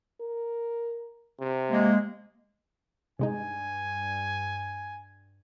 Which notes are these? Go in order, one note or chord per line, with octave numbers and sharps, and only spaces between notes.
A#4
C3
G#3 A#3
G2 C3 G#3 D#4 G#5